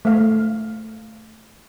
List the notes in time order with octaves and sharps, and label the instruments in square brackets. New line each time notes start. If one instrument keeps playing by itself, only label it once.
[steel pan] A3 F5